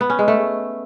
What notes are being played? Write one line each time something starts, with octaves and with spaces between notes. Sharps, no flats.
B3
C#4
G#3
A3